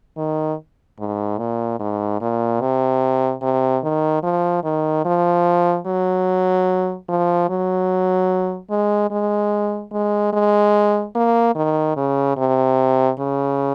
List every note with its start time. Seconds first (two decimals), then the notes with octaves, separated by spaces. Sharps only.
0.17 D#3
0.98 G#2
1.38 A#2
1.79 G#2
2.21 A#2
2.61 C3
3.42 C3
3.83 D#3
4.23 F3
4.63 D#3
5.05 F3
5.86 F#3
7.08 F3
7.49 F#3
8.70 G#3
9.11 G#3
9.92 G#3
10.33 G#3
11.15 A#3
11.55 D#3
11.96 C#3
12.37 C3
13.18 C#3